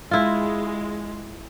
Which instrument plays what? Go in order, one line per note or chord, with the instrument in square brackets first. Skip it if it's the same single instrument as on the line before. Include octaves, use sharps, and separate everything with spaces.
[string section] G#3 [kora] E4 F4